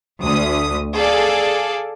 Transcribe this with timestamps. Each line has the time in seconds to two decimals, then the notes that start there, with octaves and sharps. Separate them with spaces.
0.23 D2 D#6
0.95 G#4 A4 D5 F5